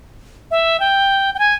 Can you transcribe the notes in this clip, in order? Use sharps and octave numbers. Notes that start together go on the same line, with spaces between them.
E5
G5
G5
G#5